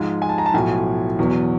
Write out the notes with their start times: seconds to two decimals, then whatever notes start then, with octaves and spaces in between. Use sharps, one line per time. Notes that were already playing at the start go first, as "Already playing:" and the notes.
Already playing: G#2 F3 G#3
0.22 G#5
0.29 A5
0.38 A#5
0.46 A5
0.54 B1 A2 F3 G#5
1.19 E2 B2 F#3